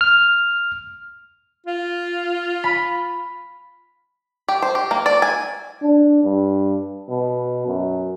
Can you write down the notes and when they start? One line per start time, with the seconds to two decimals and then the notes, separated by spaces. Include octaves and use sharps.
0.01 F6
1.66 F4
2.64 B5
4.48 G4
4.62 C5
4.75 G4
4.91 A#3
5.06 D5
5.22 G#5
5.82 D4
6.24 G2
7.09 B2
7.67 F#2